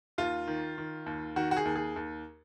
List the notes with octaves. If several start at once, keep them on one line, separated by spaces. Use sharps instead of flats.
D#2 F4
D#3
D#3
D#2
D#3 F#4
F#4
G#4
D#2
G#4
D#2